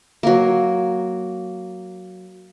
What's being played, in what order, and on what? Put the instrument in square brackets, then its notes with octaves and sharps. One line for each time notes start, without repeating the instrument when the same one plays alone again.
[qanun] F#3 A#3